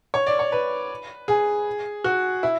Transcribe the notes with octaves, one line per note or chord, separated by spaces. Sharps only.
C#5
D5
C#5
B4
G#4
F#4
E4